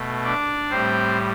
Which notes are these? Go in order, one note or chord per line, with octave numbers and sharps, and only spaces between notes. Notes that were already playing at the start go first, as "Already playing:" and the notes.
Already playing: B2 A3
D4 D5
A2 G3 C4 C5